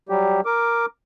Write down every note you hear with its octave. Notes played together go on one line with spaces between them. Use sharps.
F#3 G3 G4
A#4 D6